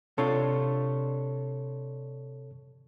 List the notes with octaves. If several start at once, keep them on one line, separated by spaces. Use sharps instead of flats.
C3 D4 F4 A4 C#5 C#6